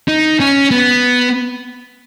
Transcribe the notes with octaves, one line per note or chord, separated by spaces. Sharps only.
D#4
C#4
B3